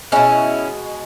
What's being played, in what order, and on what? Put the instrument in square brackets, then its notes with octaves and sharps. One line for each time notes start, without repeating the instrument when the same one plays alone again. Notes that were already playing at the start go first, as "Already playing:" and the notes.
[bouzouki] B2 G#3 C#4 E4